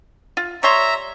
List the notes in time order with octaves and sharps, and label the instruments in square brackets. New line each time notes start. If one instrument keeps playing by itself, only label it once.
[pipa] F4
[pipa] G3 C#5 C6 [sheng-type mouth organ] E5 A#5